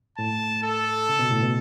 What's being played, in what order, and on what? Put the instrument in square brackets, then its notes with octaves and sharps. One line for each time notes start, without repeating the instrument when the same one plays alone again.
[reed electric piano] A2 [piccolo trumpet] A5
[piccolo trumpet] A4
[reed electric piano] C#3
B2
A2
B2